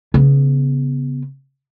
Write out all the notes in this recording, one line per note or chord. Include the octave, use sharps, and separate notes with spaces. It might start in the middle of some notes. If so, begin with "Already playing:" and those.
C#3 B3